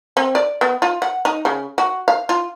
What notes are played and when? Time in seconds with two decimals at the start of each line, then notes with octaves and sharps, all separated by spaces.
0.17 C4
0.35 D5
0.61 B3
0.82 F4
1.02 F#5
1.25 D#4
1.45 C#3
1.78 F#4
2.08 F5
2.29 F4